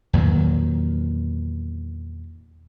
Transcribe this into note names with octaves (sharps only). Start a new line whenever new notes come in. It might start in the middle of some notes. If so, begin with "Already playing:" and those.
E2 A#2 D#3 F#3